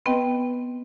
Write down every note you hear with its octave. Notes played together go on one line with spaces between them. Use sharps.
B3 C4 B4 D#5 G5